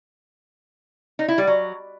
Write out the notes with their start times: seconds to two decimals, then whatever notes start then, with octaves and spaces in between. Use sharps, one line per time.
1.19 D#4
1.28 E4
1.38 G3
1.47 F#3